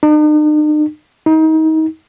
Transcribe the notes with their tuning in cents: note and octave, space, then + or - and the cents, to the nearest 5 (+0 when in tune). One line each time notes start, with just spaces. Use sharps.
D#4 -45
D#4 +30